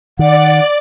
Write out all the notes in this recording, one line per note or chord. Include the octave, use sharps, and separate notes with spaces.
D#3 D5 F#5